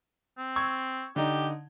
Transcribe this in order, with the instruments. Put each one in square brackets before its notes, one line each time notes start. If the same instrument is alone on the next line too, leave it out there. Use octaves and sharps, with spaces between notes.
[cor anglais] C4
[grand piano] C#6 E6 G#6
[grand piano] D3 D#4 [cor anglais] G4